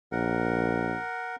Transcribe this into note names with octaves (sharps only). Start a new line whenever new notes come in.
A#1 A#4 F#5